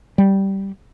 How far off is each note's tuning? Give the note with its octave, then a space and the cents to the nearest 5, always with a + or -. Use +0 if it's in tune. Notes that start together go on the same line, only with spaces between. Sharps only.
G3 -10